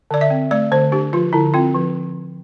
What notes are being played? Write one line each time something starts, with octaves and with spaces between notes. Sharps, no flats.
D3 D5
E5
C4
A3 D5
D3 C5
D4 G4
F3 F4
D3 E4
C4 F4
F3